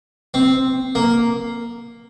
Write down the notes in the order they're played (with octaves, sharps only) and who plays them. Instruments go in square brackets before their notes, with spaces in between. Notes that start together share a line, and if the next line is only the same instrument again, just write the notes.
[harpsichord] C4
A#3